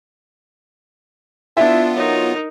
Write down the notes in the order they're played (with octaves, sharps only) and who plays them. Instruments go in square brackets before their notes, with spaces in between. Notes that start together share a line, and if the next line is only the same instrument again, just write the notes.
[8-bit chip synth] B3 F4 [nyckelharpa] D4 [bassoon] E4 [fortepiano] E5
[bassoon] F#3 [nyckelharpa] D#4 A#4